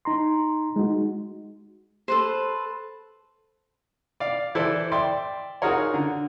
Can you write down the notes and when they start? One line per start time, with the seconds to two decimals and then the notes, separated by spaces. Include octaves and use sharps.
0.05 D#4 A#5 C6
0.76 G#3 D#4 F#4
2.08 A4 B4 C5
4.20 D5 F5
4.55 E3 E4 A4 C5 D5
4.92 D5 E5 G5 C6
5.62 D#4 F4 F#4 G#4 A#4 C#5
5.94 D3